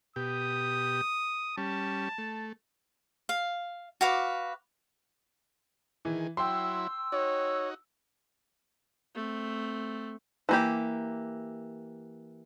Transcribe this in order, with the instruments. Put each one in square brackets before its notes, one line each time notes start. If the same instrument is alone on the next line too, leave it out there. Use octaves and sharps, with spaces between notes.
[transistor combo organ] B2 G4 [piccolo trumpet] D#6
[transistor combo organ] G3 C#4 [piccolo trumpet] A5
[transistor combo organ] A3
[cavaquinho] F5
F#4 B4 F5 D6
[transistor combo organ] D#3 G#4 [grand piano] E3
[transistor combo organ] F#3 E4 [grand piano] G5 C6 [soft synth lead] E6
[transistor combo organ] D#4 F#4 [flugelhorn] C#5
[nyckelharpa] A3 C4
[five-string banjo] E3 A#3 G4